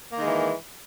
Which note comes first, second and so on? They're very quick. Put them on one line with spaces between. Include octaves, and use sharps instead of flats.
A#3 D#3 G#3 E3